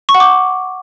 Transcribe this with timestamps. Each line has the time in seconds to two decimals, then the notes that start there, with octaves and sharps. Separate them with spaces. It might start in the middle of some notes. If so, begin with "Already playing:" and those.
0.09 C#6
0.15 F#5
0.20 D6